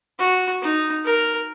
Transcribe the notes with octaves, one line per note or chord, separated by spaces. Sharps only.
F#4
D#4
A#4